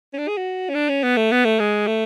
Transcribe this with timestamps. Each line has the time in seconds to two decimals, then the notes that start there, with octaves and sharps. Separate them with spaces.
0.14 C#4
0.18 D4
0.28 G#4
0.37 F#4
0.70 C#4
0.75 D4
0.89 C#4
1.03 B3
1.17 A3
1.32 B3
1.45 A3
1.60 G#3
1.87 A3